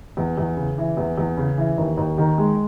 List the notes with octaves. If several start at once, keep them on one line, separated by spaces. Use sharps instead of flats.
E2
E2
C#3
E3
E2
E2
C#3
E3
D#2
D#2
D#3
G#3